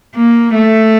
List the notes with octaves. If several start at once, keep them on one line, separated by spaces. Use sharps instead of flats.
A#3
A3